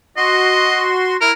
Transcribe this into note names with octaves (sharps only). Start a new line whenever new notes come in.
F#4 D#5 C6
E4 A#4